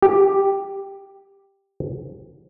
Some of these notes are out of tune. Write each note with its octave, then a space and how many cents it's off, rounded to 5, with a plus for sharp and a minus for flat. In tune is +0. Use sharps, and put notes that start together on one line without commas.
G4 +0